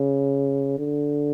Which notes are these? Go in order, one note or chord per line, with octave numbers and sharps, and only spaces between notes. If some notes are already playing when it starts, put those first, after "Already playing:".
Already playing: C#3
D3